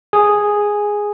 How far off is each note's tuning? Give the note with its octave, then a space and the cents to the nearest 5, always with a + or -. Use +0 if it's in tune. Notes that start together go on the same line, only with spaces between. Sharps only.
G#4 -5